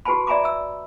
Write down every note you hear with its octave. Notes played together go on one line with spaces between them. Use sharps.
F#4 G4 B4 G#5 A5 B5
D5 E5 G#5 A#5 B5 D6
E5 E6